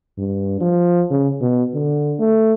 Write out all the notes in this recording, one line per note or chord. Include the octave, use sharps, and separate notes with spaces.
G2
F3
C#3
B2
D3
A3